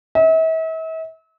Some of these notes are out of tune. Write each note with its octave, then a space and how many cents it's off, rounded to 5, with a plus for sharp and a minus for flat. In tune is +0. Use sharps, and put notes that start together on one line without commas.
E5 -40